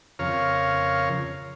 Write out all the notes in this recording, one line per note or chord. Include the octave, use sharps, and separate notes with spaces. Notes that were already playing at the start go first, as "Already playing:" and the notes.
F2 C#3 A#4 C#5 F5